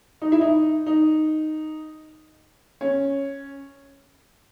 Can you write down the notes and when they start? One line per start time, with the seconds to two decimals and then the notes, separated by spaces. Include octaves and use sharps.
0.22 D#4
0.32 E4
0.41 D#4
0.87 D#4
2.81 C#4